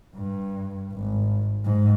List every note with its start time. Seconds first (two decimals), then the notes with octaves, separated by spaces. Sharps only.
0.15 G2
0.93 G#1
1.65 G#2